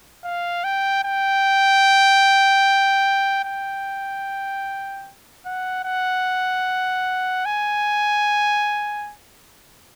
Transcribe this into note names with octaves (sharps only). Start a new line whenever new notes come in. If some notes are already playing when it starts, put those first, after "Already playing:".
F5
G5
G5
G5
F#5
F#5
G#5